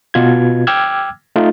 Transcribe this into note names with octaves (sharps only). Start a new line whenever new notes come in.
B2 F4 G#6
G5 D6 E6 F6 G#6
A3 D#4 F4